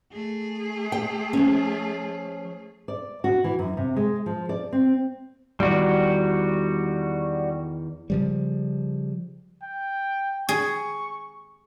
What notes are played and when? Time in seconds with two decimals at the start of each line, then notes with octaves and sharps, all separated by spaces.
0.12 A3 G#4
0.92 G5
1.33 F3 C#4
2.88 D5
3.24 F#4
3.44 E3
3.59 F#2
3.77 C3
3.96 G#3
4.26 F3
4.49 D5
4.73 C4
5.60 E2 D#3 G3 F#4
8.10 C#3 F3 G3
9.62 G5
10.49 G#4 C#6